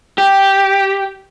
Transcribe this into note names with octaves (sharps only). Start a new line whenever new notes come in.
G4